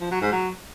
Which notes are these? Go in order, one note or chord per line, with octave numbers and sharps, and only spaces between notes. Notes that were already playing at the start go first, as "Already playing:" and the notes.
F3
F#3
G#2
F#3